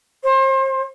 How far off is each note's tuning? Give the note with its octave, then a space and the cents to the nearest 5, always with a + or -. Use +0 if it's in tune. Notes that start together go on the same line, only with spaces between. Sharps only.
C5 +35